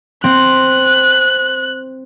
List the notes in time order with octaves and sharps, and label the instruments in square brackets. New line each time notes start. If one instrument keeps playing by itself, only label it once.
[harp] C4 [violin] F#6